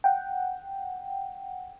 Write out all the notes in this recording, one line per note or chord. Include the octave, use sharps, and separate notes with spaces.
F#5 G5